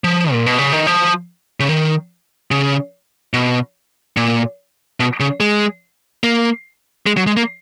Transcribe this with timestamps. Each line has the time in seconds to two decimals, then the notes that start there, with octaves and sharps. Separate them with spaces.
0.04 F3
0.32 A#2
0.46 B2
0.59 C#3
0.73 D#3
0.87 F3
1.60 C#3
1.69 D#3
2.51 C#3
3.34 B2
4.17 A#2
5.00 B2
5.20 C#3
5.40 G#3
6.24 A#3
7.06 G#3
7.17 F#3
7.27 G#3
7.37 A#3